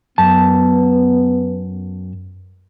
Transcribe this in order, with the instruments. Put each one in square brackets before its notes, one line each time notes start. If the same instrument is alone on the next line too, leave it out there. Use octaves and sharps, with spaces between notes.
[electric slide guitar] F#2 A5 [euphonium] B3